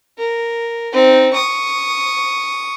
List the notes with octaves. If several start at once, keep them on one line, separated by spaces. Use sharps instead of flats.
A#4
C4 D#4
C#6 D#6